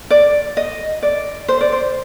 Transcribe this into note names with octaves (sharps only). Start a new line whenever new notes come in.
D5
D#5
D5
C5
D5
C5